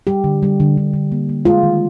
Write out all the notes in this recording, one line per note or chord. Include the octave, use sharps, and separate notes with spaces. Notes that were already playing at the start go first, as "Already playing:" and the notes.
G3 G4
D3
G3
D3
D3
D3
A#3
A#3
G#3 F4
D#3